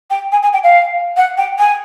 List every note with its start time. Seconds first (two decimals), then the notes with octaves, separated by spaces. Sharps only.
0.10 G5
0.32 G#5
0.42 G#5
0.53 G5
0.63 F5
1.16 F#5
1.37 G5
1.58 G#5